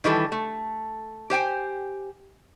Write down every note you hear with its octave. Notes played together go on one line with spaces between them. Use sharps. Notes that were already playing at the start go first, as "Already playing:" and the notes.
D#3 E3 G3 A4
A3
G4 C5 G5 G#5